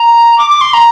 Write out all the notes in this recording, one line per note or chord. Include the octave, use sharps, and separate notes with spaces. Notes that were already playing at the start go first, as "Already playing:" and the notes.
Already playing: A#5
D6
D6
C6
A#5